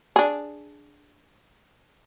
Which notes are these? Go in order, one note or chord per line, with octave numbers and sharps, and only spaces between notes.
D4 G#4